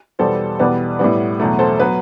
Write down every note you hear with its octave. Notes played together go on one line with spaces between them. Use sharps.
E2 B2 G3 B3 A4 C5
E2 B2 G3 B4 D5
A2 G3 B3
E2 B2 F#3 A3
A4 C5
F#3 B3 B4